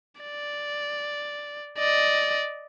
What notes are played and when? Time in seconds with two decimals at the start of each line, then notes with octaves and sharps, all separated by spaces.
0.21 D5
1.78 D5 D#5